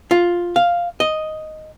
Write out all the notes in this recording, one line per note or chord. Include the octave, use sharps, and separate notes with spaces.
F4
F5
D#5